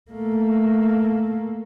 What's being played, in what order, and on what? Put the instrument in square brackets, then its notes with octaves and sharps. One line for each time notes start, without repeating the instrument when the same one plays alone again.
[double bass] A3 A#3